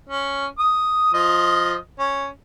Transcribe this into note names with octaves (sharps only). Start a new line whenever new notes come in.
C#4
D#6
F3 D#5
C#4